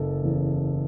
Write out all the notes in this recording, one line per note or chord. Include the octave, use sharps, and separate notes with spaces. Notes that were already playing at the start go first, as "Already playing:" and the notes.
Already playing: F#1 A4
E2 C#3